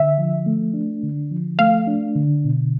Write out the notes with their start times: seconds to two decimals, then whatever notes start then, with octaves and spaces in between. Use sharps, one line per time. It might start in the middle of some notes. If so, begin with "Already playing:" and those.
Already playing: D3 E5
0.18 F3
0.46 A3
0.74 D4
1.03 D3
1.31 F3
1.59 A3 F5
1.87 D4
2.16 D3
2.44 B2